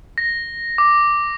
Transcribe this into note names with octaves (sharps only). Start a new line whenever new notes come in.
A#6
D6